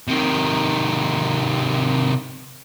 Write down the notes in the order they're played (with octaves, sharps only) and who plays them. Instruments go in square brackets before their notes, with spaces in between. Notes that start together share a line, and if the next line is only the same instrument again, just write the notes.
[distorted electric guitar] C3 D#3